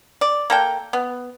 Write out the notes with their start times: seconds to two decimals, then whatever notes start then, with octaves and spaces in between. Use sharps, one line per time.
0.21 D5
0.50 A#3 A4 G5
0.93 B3